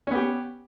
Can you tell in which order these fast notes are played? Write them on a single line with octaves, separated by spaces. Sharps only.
C#4 B3 G4